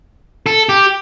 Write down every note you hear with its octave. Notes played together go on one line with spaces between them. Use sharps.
A4
G4